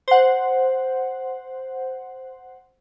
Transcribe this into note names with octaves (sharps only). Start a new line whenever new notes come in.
C5 F#5